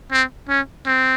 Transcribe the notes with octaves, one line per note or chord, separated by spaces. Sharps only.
C4
C#4
C4